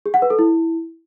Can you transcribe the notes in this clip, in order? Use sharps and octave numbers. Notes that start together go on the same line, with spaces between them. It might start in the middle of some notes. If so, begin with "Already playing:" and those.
G#4
F#5
B4
A4
E4